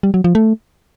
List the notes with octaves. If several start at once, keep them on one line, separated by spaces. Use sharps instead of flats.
G3
F#3
F3
A3